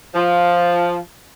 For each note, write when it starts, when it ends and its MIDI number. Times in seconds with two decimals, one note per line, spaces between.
0.14 0.96 53